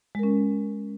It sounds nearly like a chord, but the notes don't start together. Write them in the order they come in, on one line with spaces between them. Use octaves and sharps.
G#3 A#4 C#4